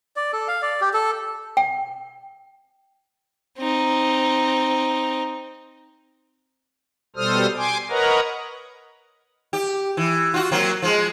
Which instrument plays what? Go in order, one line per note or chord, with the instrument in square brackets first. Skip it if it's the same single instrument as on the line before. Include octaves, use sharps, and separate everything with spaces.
[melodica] D5
A4
F5
D5
G4
A4
[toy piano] G5
[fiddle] C4 D#4
[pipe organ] B2 G3 A4 C5 D#6 F6
G#5 C6 D6
A#4 B4 C#5 D#5 F#5 A#5
[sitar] G4
E3
F4 F#4
F#3 A#3 C4
F3 G#3